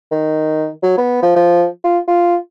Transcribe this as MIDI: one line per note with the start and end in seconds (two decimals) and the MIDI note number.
0.11 0.68 51
0.83 0.93 54
0.98 1.18 59
1.22 1.31 53
1.36 1.65 53
1.84 1.99 65
2.08 2.35 65